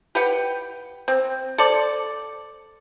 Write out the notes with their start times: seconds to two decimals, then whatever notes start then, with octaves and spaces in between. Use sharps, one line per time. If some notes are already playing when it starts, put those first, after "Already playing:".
0.15 G4 B4 F#5 G5
1.08 C4
1.58 A4 C5 D5